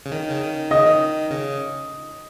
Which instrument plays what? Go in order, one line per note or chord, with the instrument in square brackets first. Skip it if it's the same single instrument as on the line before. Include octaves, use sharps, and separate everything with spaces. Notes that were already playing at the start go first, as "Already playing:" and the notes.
[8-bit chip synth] C#3
D#3
C#3
D#3
[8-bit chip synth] C#3 [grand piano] D#5
[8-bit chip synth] D#3
C#3